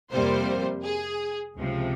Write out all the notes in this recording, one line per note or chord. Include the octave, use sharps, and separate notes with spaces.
F2 C3 G3 A#3 C5
G#4
C#2 C3 F3